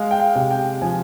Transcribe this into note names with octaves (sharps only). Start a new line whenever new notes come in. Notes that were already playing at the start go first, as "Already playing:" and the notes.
Already playing: G#3 F5
G5
F5
C3
G5
F3 G#5